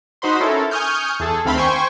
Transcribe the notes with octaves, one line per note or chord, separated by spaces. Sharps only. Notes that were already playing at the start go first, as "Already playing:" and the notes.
D#4 F#4 C5 B5 C6
C#4 E4 A4 A#4
G#5 C#6 D#6 F6 G6
E2 G#4 A4
D2 D#3 C4 F5 B5 C6
C5 G5 G#5 C#6